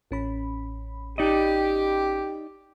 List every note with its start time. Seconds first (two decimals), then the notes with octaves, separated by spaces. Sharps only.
0.11 A1 C#4 B5
1.18 D#4 G4 D5 D#5